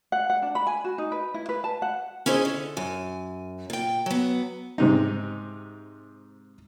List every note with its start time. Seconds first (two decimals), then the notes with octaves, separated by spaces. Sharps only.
0.12 F#5
0.30 F#5
0.42 D4
0.55 B5
0.67 G#5
0.84 F#4
0.98 D#4
1.12 B4
1.34 E4
1.49 B4
1.64 A5
1.82 F#5
2.26 C#4 E4 G#4 C5 D#5
2.45 D3
2.77 F#2 G#5
3.70 A#2 G5
4.06 F#3 B3
4.78 G#2 C3 D#4